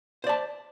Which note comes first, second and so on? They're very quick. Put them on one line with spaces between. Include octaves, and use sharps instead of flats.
C5 D5 A5